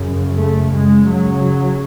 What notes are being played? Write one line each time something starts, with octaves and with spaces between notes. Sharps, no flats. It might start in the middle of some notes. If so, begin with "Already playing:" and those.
Already playing: F#2 C#3
A3
F#2 C#3 G#3
F#3